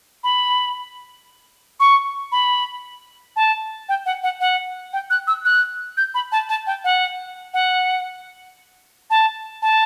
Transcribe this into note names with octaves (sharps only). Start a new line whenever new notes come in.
B5
C#6
B5
A5
G5
F#5
F#5
F#5
G5
F#6
E6
F#6
G6
B5
A5
A5
G5
F#5
F#5
A5
A5